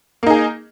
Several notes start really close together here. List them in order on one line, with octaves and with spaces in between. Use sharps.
A#3 D#4 G#4